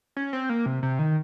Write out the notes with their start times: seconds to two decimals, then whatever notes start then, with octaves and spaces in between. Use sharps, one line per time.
0.17 C#4
0.33 C4
0.50 A#3
0.66 C3
0.83 C3
0.99 D#3